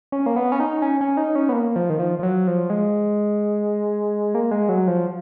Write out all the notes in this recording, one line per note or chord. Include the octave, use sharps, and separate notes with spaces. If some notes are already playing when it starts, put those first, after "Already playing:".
C#4
A#3
B3
C#4
D#4
C#4
C#4
D#4
C#4
B3
A#3
F3
D#3
F3
F3
F#3
F3
G#3
A#3
G#3
F#3
F3